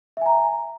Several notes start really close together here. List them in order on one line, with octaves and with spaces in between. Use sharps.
E5 G#5 A#5